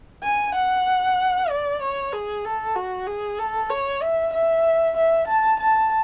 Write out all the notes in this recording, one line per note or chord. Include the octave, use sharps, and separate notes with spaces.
G#5
F#5
D5
C#5
G#4
A4
F#4
G#4
A4
C#5
E5
E5
E5
A5
A5